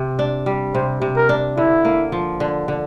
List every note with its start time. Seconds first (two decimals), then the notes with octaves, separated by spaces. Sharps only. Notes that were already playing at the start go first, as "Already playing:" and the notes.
Already playing: C3
0.19 D4
0.46 G3
0.74 C3 C5
1.02 C3
1.16 A#4
1.29 D4
1.57 D3 E4
1.85 A#3
2.12 F3
2.40 D3
2.68 D3